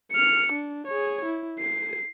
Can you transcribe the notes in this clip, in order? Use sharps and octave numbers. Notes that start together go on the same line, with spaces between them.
F6 C#7
D4
G#4 C#5
E4
C7